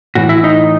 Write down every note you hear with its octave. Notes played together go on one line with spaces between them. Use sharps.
A2 E3 F#4
E4
D#4